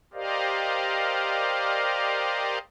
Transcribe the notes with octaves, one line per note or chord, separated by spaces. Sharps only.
G4 A#4 C5 D5 D#5 F5